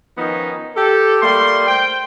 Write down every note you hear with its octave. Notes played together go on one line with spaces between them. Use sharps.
D#3 F3 B3 C#4 D#4
G4 A4
G3 A3 A#3 C6
C5 G5